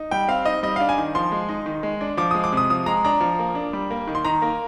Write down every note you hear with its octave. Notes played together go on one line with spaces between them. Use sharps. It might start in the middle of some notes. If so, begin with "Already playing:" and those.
Already playing: D#4
G3 G5
C4 F5
D#4 D#5
G3 D#5
D4 F5
G#5
D#3
F3 C6
G#3
D#4
D#3
G#3
D4
F3 D6
G#3 D#6
D6
C3 D#6
F3 D#6
G#3 A#5
D4 A#5
F3
A#3
D4
G3
A#3
D#3
C6
D#3 A#5
A#3